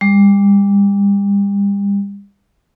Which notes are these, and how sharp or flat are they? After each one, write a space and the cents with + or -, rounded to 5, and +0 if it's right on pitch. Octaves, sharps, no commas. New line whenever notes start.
G3 +35